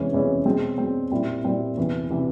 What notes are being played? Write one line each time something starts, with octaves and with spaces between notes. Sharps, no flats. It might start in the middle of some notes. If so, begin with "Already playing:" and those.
Already playing: E2 C3 E3 G#3 C#4
E2 C3 E3 G#3 C#4
B2 G#3 C4
B2 G#3 C4
A#2 G3 C4 E4
A#2 G3 C4 E4
E2 C3 E3
C3 E3